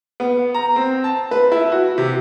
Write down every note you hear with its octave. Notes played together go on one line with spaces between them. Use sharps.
B3
A#5
C4
A5
B4
E4
F#4
C3